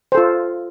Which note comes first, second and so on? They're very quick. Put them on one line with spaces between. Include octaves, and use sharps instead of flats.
C5 A4 F4